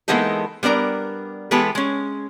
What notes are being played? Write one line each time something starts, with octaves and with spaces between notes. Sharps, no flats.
E3 G#3 A#3 B3 D#4 A4
G3 B3 D4 A#4 A#5
E3 G#3 B3 G4 A4 B4
G#3 C#4